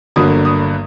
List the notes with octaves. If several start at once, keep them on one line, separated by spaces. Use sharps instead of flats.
G1 G2 D3 F#3 A#3 D#6
D#6